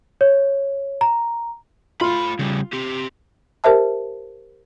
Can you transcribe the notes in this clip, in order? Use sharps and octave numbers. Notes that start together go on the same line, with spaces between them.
C#5
A#5
A3 F4 B5
C#3 G3
C4 G4
G4 A#4 C5 E5 A5